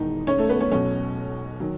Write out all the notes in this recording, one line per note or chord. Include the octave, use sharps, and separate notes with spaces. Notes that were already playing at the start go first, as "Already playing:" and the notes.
Already playing: E1 E2 D#3 D#4
C#4 C#5
A3 A4
B3 B4
C#4 C#5
B1 B2 F#3 C#4 C#5
D#3 F#3